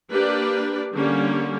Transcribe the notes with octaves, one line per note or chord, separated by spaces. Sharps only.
A#3 D4 G4 B4 D5
D3 G3 A#3 C#4